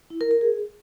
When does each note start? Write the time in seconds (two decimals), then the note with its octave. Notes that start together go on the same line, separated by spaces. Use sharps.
0.10 E4
0.21 A#4
0.31 A#4
0.41 G#4